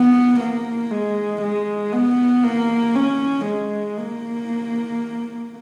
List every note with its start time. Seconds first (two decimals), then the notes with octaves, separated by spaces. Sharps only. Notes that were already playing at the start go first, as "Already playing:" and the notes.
Already playing: B3
0.40 A#3
0.91 G#3
1.42 G#3
1.93 B3
2.43 A#3
2.95 C#4
3.45 G#3
3.97 A#3